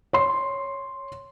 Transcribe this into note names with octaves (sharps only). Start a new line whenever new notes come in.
C#5 C6